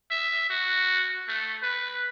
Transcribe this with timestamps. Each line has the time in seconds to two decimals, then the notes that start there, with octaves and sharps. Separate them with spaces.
0.11 E5
0.50 F#4
1.28 A3
1.63 B4